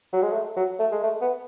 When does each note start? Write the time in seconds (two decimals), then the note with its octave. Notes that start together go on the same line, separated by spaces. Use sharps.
0.13 F#3
0.22 G#3
0.33 A3
0.57 F#3
0.79 A3
0.92 G#3
1.04 A3
1.21 B3